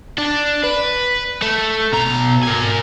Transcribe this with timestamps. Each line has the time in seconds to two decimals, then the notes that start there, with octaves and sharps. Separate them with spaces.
0.18 D4
0.63 B4
1.42 A3
1.93 B2 A#5
2.43 A#4 G#5